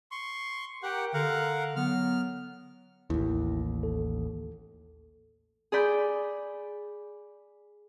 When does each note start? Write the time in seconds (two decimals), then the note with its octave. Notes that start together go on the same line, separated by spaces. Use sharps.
0.11 C6 C#6
0.83 G4 A#4 F#5 G5
1.14 D3 A#4 F5 F#5
1.76 F#3 B3 F6
3.10 A1 D#2 E4
3.83 A4
5.72 G#4 D5 B5 G6